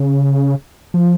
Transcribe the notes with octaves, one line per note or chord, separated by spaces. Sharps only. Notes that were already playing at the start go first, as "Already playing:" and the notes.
Already playing: C#3
F3